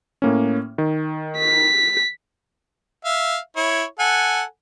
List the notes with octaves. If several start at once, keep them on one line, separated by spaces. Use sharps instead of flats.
A2 A#3 C#4
D#3
B6
E5 F5
E4 C#5
A4 F#5 G#5